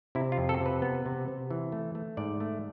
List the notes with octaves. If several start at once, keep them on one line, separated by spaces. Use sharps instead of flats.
C3 E4
F4
F2
A4
C3 B4
B3
C3
C3
E3
A3
A3
G#2 D5
A3